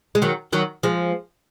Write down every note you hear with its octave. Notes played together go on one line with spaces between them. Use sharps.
G#3
D#3 F#3
D#3 F#3
F3 G#3